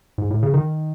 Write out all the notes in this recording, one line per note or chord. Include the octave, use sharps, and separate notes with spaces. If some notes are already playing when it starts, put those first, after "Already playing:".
G#2
A2
C#3
D#3